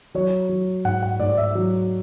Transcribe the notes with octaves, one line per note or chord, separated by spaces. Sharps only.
F#3 C#5
F#3
G#2 F#5
F#5
G#2 D5
E5
F#3